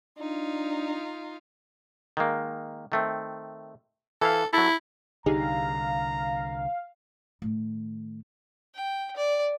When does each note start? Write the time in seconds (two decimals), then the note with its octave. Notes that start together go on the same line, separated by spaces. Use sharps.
0.19 D4 D#4 F4
2.17 D#3 G#3 A#3
2.92 D#3 A3 C4
4.21 E3 E4 A4 F5
4.53 F#3 E4 A4
5.26 C2 D3 D#4 G4 G#4 F5 A#5
7.42 A2 D#3
8.75 G5
9.16 D5